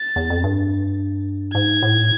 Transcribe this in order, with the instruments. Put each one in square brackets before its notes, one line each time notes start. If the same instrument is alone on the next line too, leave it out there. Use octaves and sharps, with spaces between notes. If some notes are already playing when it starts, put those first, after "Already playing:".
Already playing: [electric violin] A6
[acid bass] E2
F2
G2
[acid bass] G#2 [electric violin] G#6
[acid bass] A2